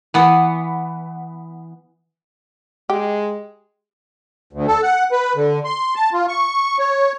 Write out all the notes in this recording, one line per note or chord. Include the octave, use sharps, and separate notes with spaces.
E3 B3
G#3 G4
D2
A4
F#5
B4
D3
C6
A5
F4
C#6
C#5